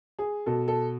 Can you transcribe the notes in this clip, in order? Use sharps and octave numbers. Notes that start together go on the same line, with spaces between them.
G#4
B2 A4
A4